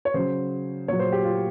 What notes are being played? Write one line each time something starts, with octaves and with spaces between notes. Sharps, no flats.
C#5
C#3 F#3 C5
A#2 F#3 C#5
C5
G4
F4